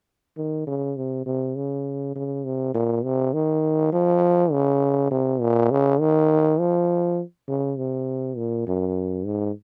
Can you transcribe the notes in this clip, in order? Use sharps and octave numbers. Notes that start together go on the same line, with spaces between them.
D#3
C#3
C3
C3
C#3
C#3
C3
A#2
C3
D#3
F3
C#3
C3
A#2
C#3
D#3
F3
C#3
C3
A#2
F#2
G#2